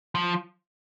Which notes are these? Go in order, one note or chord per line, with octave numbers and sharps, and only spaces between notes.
F3